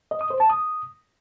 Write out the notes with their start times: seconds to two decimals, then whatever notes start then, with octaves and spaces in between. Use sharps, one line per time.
0.11 D#5
0.21 D#6
0.30 C5
0.40 A5
0.50 D#6